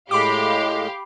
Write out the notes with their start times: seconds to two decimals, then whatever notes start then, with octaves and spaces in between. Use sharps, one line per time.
0.11 A2 G#3 G4 F5 B5 D6